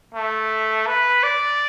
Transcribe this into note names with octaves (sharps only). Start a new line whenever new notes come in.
A3
B4
D5